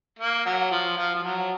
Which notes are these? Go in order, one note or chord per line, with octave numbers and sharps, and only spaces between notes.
A#3
F#3
F3
F3
F3
F#3